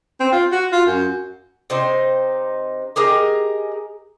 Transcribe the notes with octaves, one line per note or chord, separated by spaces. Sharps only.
C4
F4
F#4
F4
F#2
C3 D#4 C5
G4 G#4 A#4 D#5